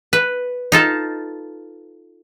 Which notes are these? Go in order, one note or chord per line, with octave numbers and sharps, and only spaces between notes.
B4
D#4 F4 A4